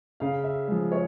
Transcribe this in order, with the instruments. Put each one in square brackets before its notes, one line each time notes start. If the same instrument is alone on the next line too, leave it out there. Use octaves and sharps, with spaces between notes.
[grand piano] C#3 F5
E5
F3 G#3
C#5